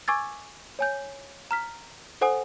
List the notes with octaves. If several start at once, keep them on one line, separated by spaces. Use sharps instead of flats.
G#5 C#6 D6 E6 G#6 A6
C#5 G#5 G6
A#5 F6 B6
A4 C5 F#5 G#5 D#6